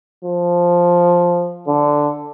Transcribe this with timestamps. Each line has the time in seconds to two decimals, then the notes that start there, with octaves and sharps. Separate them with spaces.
0.25 F3
1.68 D3